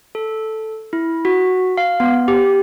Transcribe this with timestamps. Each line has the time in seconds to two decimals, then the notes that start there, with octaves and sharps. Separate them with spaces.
0.15 A4
0.93 E4
1.25 F#4
1.78 F5
2.00 B3
2.28 G4